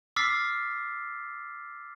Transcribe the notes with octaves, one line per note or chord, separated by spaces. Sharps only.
D6 E6 F6 A6 B6 C7